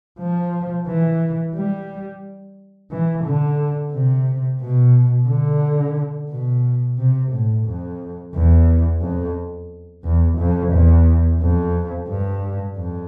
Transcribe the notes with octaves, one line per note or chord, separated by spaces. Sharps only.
F3
E3
G3
E3
D3
C3
B2
D3
B2
C3
A2
F2
E2
F2
E2
F2
E2
F2
G2
F2